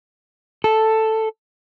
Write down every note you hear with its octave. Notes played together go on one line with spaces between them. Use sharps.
A4